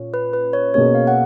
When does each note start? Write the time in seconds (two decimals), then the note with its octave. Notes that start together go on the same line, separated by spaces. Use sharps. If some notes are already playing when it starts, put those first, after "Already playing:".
Already playing: A#2 C#4
0.14 B4
0.33 B4
0.53 C#5
0.74 B2 A#3 C#4 G#4 C#5
0.95 F5
1.07 F#5